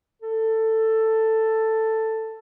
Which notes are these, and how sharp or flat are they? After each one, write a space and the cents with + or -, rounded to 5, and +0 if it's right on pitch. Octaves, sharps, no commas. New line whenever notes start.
A4 +10